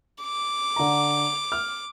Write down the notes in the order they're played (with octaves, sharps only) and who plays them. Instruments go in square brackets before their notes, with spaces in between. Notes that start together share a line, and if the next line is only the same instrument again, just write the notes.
[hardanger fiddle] D6
[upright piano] D3 A#5
F6